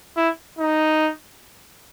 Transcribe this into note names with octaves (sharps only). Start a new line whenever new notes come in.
E4
D#4